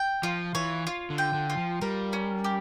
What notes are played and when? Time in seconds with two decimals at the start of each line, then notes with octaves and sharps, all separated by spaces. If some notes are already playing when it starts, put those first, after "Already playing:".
Already playing: G5
0.23 F3 F4
0.55 E3 C#5
0.87 F4
1.10 D3
1.18 G5
1.34 D3
1.50 F4
1.57 F3
1.81 G3 A#4
2.13 C#4
2.44 G4